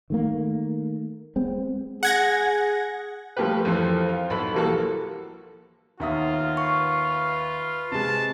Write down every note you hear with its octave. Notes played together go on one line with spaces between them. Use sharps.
D#3 A3 A#3
G#3 B3 C4
G#4 F#5 G#6 A#6
F3 G3 A3 A#3 G4 B4
F2 E3 F3 A4 C5
F4
B1 A4 B5
E3 F3 G3 A#3 F#4 A4
D#2 B3 F4 E5 A#5 D#6
B4 F5 C#6
C3 G#3 A5